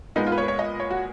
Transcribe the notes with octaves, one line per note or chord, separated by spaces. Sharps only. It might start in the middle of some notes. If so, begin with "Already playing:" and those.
A#2 G#3 B3 D#4
F4
B4
C#5
B4
C#5
D#5
C#5
F#4